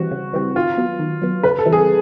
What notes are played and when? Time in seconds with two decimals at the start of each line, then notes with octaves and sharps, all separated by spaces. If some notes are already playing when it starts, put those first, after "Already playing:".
Already playing: E3 G3 C4 F#4
0.11 C#3
0.33 E3 G3 C4
0.56 D#3 F4
0.78 F#3 B3
0.99 D#3
1.22 F#3 B3
1.43 C#3 B4
1.58 A4
1.65 E3 G3 C4 E4
1.72 G#4